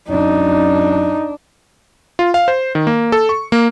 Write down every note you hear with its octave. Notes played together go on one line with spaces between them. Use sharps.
F#2 D4 D#4
F4
F5
C5
D#3
A#3
A4
C#6
A#3